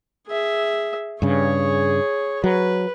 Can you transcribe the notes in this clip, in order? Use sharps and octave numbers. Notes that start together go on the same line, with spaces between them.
G#4 E5
G2 C#3 G#4 C#5
F#3 B4